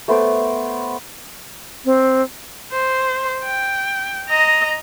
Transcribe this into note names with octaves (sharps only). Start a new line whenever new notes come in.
A3 B3 C5 D6
C4
C5
G5
D#5 A#5